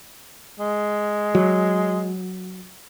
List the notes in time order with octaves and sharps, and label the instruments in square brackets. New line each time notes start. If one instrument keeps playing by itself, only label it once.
[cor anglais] G#3
[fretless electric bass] F#3